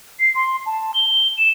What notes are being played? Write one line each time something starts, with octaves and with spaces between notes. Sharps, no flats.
C7
C6
A5
G7
E7